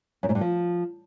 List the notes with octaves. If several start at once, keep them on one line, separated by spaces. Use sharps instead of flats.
F#2
G#2
G2
F3